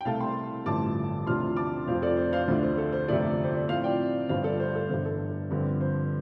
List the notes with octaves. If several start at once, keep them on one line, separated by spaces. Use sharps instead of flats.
G5
C2 C3 A3 F5 A5
G5 C6
A1 G2 D3 F3 A3 A5 D6
D2 C3 F3 D4 F4 C6 F6
A5 D6
F1 F2 F3 C4 F4 C5 F5
A4 D5
C5
C5 F5
D2 D3 A3 D4 F4 C5
C5
A4
C5
G1 F2 C3 A3 F4 A4 D5
C5
D5
A2 F3 A3 C4 F4 C5 F5
D5 G5
G1 G2 G3 F4 C5 F5
A4 D5
C5
A4
G1 G2 D3 C5
A4
G2 D3 F3 C4 F4
C5